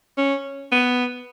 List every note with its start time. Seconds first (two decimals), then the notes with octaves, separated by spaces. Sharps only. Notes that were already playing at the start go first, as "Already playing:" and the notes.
0.18 C#4
0.72 B3